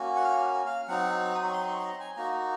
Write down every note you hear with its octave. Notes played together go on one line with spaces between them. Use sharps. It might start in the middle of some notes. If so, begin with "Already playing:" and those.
Already playing: A#3 C#4 F#4
F#5
F5
F5
F#3 C4 D#4 F#5
D#6
C#6
C6
C#6
C6
A#5
G#5
A#3 D#4 F#4 A#5